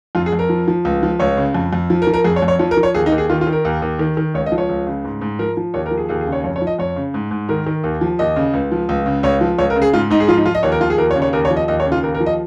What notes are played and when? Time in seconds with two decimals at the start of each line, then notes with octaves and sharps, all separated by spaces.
0.15 F2 F4
0.26 G#4
0.33 F2
0.39 A#4
0.49 F3
0.68 F3
0.85 C#2
1.03 F3
1.20 C#2 C#5
1.37 C#3
1.55 F2
1.73 F2
1.90 F3
2.02 A#4
2.07 F3
2.14 A#4
2.25 F2 G#4
2.36 C#5
2.42 F2
2.48 C#5
2.59 F3 C#5
2.71 A#4
2.77 F3
2.83 C#5
2.94 D#2 G#4
3.06 D#4
3.12 D#2
3.18 G#4
3.30 D#3 F4
3.41 F4
3.47 D#3
3.52 A#4
3.65 D#2
3.82 D#2
3.99 D#3
4.17 D#3
4.34 C#2 C#5
4.46 D#5
4.52 F3
4.58 C#5
4.69 C#2
4.87 C#3
5.04 G#2
5.21 G#2
5.39 F3 A#4
5.57 F3
5.74 D#2 C#5
5.86 A#4
5.91 F3
5.97 G#4
6.09 D#2 G#4
6.21 G#4
6.27 C#3
6.32 C#5
6.44 F2 C#5
6.56 C#5
6.62 F3
6.67 D#5
6.79 F2 C#5
6.96 C#3
7.14 G#2
7.31 G#2
7.49 D#3 A#4
7.66 D#3
7.84 D#2
8.01 F3
8.19 D#2 D#5
8.36 C#3
8.54 C#2
8.72 F3
8.89 C#2
9.06 C#3
9.23 C#2 C#5
9.41 F3
9.58 C#2 C#5
9.70 A#4
9.76 C#3
9.82 G#4
9.93 G#2 F4
10.10 G#2 D#4
10.20 G#4
10.28 F3 F4
10.37 D#4
10.45 F3 F4
10.55 D#5
10.63 D#2 C#5
10.72 A#4
10.81 F3 F4
10.90 G#4
10.98 D#2 A#4
11.11 C#5
11.16 C#3
11.22 C#5
11.33 D#2 A#4
11.45 C#5
11.50 F3
11.57 D#5
11.68 D#2 D#5
11.80 C#5
11.86 C#3
11.92 F4
12.03 D#2 A#4
12.14 A#4
12.20 F3
12.26 D#5